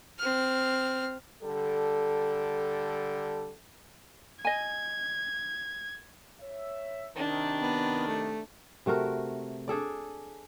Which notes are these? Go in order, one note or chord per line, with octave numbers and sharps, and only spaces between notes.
C4 F6
D3 G3 A4
D#5 G#5 G#6
C#5 E5
C3 D#3 D4
B3
A3
C3 A3 F#4 A#4
D4 G#4 A4 D5